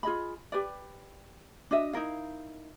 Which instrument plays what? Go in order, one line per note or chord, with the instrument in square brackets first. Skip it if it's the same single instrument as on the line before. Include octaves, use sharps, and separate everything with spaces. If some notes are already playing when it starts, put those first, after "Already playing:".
[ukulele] F4 G#4 D#5 B5
G4 B4 D5
D4 F#4 D#5 E5
D#4 E4 A#4 F5